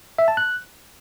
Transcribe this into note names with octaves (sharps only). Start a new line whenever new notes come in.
E5
A5
F#6